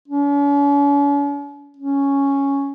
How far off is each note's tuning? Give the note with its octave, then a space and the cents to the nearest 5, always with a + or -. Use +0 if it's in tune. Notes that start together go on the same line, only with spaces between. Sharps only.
C#4 +45
C#4 +0